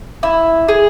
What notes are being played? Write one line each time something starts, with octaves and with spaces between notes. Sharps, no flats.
E4
G#4